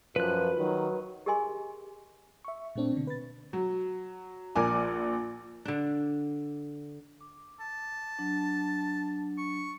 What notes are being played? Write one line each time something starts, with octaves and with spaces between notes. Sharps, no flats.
F#2 F3 B4 F#6
D#3 F#3
G4 G#4 A#4 D#5 G#5 C6
E5 C#6
A#2 A3 C4 D4
B2 D3
B4 A6
F#3
A#1 A#4 G#5 D6
D3 D4
D6
A5
F#3 D4
C#6